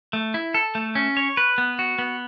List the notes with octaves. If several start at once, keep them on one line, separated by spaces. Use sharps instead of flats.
A3
E4
A4
A3
C#4
C#5
B4
B3
F#4
B3